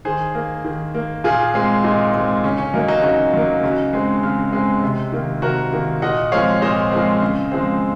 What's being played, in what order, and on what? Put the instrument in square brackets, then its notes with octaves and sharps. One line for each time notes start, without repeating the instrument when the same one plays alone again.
[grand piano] D#3 G#4 C5
A#3
D#3
A#3
A#2 F4 G#4
G#3 C4
A#2 D#4
G#3 C4
C#3 C#4
C#4
F#3 A#3 D#4
D#4 F#4
C#3 D#4 F#4
F#3 A#3
C#3
G#3 C4
C#3
G#3 C4
C3
D#3 A#3
C3 F#4 A#4
D#3 A#3
A#2 D#5 F#5
F3 G#3 C4 C#5 F5
A#2 C5 D#5
F3 G#3 C4
C#3
F3 G#3 C4